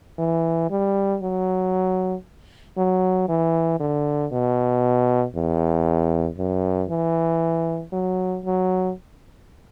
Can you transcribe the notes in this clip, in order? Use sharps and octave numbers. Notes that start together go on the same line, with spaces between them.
E3
G3
F#3
F#3
E3
D3
B2
E2
F#2
E3
F#3
F#3